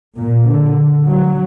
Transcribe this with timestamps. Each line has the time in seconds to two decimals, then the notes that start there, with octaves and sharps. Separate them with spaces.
0.17 A#2
0.48 D3
1.06 F#3